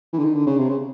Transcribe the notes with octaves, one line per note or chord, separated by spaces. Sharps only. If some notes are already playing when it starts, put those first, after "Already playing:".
E3
D3
D#3
D3
C#3
C3
C#3